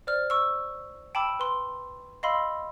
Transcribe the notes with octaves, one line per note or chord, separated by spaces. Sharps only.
C5 D5 F6
C#6 E6
G5 A5 B5 D6 E6
B4 C6
D#5 F5 B5 C6 E6